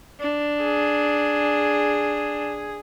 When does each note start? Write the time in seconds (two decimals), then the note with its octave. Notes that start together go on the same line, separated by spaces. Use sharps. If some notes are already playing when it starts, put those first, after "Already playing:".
0.20 D4
0.63 G#4